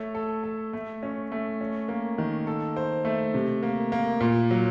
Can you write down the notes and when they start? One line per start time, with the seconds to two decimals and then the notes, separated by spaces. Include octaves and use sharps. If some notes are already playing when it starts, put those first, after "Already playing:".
Already playing: A3 C#5
0.15 A4
0.44 A4
0.73 A3
1.03 C#4
1.32 A3
1.61 C#4
1.88 A#3
2.18 D#3
2.47 A4
2.76 C5
3.05 A3
3.34 C3
3.63 A#3
3.92 A#3
4.20 A#2
4.51 F#3